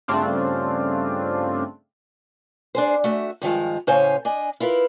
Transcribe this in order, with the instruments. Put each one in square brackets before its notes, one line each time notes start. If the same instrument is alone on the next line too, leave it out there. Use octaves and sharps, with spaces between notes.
[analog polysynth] G2 C#3 A3 C4 D4 F4
[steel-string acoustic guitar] D4 G#4 C5
A3 F#4 E5
G2 D#3 F3 G#3
A2 C#3 C5 C#5 F5 G#5
D4 D#5 G#5
E4 F4 A#4 B4